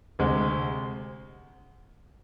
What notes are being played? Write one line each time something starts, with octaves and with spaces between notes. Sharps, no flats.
D2 C3 G#3